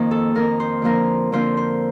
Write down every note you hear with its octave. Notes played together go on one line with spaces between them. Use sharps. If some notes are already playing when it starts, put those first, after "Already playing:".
Already playing: F2 D#3 A#3
A4
F2 D#3 A#3 A#4
C5
D3 F3 A#3 F4 A#4
D3 F3 A#3 F4 C5
C5